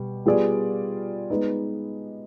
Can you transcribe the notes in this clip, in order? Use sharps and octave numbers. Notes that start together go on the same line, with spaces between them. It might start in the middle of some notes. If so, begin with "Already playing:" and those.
Already playing: B2 G3
G3 B3 F4 G#4 D5
G#3 B3 D#4 B4